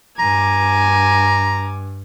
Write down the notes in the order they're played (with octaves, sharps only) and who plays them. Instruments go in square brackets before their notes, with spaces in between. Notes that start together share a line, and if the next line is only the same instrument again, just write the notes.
[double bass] G2 [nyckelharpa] G#5 D6 [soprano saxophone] A#5